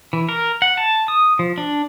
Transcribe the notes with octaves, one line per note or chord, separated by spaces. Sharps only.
E3
A#4
F#5
A5
D#6
F3
D4